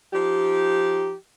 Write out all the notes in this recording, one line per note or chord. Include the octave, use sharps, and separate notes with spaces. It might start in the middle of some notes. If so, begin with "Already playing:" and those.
F3 D#4 G4